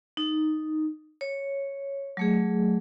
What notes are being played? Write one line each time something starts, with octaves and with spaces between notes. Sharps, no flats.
D#4
C#5
F#3 A3 G#4